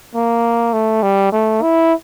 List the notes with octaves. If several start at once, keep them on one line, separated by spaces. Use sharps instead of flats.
A#3
A3
G3
A3
E4